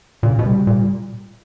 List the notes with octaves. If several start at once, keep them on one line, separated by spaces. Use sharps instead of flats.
A#2 C#3
B2
G3
A#2